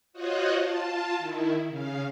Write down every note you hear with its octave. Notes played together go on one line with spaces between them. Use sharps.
F4 F#4 C5 C#5 D#5 F#5
F4 A5
D#3 E4
C#3 F5